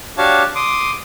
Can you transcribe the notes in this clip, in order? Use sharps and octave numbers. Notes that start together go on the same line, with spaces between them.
D4 F#4 G4 C#5 F5 A5
C6 D6 D#6